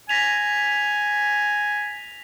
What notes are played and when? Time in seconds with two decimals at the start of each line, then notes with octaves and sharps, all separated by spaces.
0.09 G#5 A#6 B6 F7